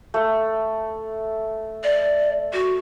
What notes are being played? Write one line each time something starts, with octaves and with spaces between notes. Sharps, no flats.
A3
D5
F#4